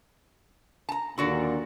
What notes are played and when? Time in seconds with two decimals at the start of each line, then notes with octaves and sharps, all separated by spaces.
0.89 A5 A#5
1.18 D#2 A#2 D3 F#4 D5